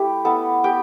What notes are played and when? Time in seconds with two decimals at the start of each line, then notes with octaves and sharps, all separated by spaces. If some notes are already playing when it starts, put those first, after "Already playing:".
Already playing: A3 E4 G4
0.25 B3 E4 A4 A5
0.64 B3 G4 G5